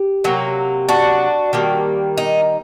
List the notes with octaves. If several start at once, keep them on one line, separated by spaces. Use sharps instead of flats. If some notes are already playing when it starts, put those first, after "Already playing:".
Already playing: G4
C3 F#3 A#3
D4 F#4
D#3 G3 A#3
D#4